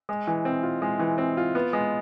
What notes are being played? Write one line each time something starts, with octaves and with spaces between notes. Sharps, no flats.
G#3
E3
C4
F4
G#3
E3
C4
F4
B3
G#3